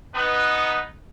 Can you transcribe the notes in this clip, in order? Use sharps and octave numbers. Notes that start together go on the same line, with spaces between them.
B3 D#4 B4